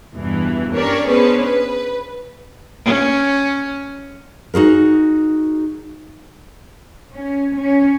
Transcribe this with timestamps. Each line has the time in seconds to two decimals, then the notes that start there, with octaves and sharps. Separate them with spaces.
0.14 E2 G2 B2 E3
0.75 C#4 D4 G4 A#4 C#5 D5
1.07 B3 C#4 D4 G#4 B4 C5
1.44 B4
2.85 C#4
4.54 D#4 F#4 G#4 A#4
7.15 C#4
7.58 C#4